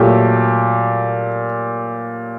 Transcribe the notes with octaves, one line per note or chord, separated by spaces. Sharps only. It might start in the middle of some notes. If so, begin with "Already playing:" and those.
Already playing: A#2 F#3 A3 G4